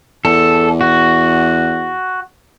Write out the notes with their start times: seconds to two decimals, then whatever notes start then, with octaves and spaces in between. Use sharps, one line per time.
0.25 E2 A4
0.81 F#4